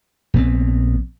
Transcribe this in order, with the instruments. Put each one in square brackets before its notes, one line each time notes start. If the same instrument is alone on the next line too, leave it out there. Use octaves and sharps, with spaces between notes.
[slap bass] A#1 B3 C4